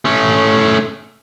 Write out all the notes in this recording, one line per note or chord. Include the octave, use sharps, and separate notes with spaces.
A3 C#4